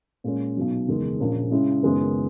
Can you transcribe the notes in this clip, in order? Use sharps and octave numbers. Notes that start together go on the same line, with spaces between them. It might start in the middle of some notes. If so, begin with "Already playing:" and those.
A#2 G#3 C#4
B1 B2 F#3
F#1 E2 D#3 G#3
A#1 A#2 A#3 C#4
C#3 G#3 C#4 E4
F#1 F#2 D#3 G#3 B3